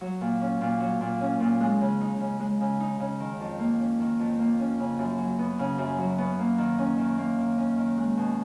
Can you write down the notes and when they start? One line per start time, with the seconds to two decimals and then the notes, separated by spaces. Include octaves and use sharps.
0.01 F#3
0.21 A#2
0.41 C#4
0.61 A#2
0.80 F#3
1.01 A#2
1.21 C#4
1.40 A#2
1.60 G#3
1.81 C#3
2.01 D#4
2.20 C#3
2.40 G#3
2.61 C#3
2.80 D#4
3.00 C#3
3.20 D#3
3.40 F2
3.59 A#3
3.79 C#4
4.00 D#3
4.19 F2
4.39 A#3
4.59 C#4
4.79 C#3
4.99 F#2
5.18 F#3
5.39 B3
5.59 C#3
5.78 F#2
5.98 F#3
6.18 B3
6.39 A#3
6.58 D#3
6.78 C#4
6.98 D#3
7.18 A#3
7.38 D#3
7.58 C#4
7.78 D#3
7.97 G#3
8.17 B2